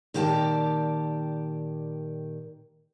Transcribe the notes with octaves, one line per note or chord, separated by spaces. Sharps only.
A#2 D#3 G4 D5 G#5 A5